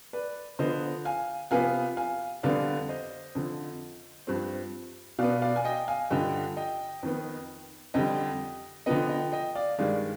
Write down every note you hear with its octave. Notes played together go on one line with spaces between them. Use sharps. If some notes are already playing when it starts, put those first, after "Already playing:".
B4 D5
D3 F3 B3 C5 D#5
F5 G#5
C3 F3 B3 F5 G#5
F5 G#5
F2 D3 G3 B3 D5 F5
C5 D#5
F2 D3 F3
G2 F3 C4
B2 B3 D5 F5
D5 F5
G#5
D#5 G5
F5 G#5
G2 D3 F3 D#5 G5
D#5 G5
F2 D#3 B3
F2 D3 G3 D#5 G5
D3 F3 B3 D#5 G5
D#5 G5
D#5 G5
D5 F5
G2 D#3 G#3 D5 F5